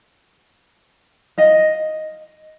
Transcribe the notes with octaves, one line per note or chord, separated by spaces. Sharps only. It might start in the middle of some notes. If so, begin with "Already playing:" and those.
D#5 F5